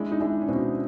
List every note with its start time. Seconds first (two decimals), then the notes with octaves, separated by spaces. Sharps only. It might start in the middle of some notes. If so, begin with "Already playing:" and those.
Already playing: G#3 D4 E4
0.12 D#4
0.20 G#3 D4 E4
0.42 C#4
0.48 B2 C4 D4